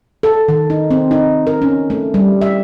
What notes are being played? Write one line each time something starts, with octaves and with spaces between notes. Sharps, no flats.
A4
D#3
D#4
C4
D#4
A#4
C#4
A3
G3
E5